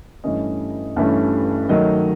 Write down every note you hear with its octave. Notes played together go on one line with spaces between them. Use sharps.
G2 E3 A3 C#4 D#5
G2 E3 A3 C#4
D#3 F#3 A3 D#5